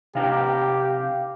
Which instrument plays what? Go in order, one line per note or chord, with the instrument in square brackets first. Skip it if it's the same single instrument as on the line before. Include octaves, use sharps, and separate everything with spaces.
[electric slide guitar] C3 D#4 [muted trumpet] G4 [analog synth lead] F5